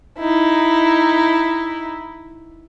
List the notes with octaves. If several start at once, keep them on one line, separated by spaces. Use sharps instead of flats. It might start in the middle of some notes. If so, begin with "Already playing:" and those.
D#4 E4